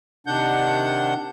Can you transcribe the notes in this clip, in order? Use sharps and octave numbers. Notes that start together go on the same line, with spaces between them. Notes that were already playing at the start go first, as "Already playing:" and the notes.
C3 D#3 D4 F#5 G6